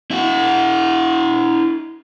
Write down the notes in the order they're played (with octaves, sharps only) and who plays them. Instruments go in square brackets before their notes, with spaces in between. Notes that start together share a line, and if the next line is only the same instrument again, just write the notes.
[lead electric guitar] E4 F#4